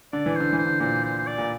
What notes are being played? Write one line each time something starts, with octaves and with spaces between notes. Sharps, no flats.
D3 D5
E3
D3 C5
E3
C5
D3
A#2 C5
C5
C5
D5
A#2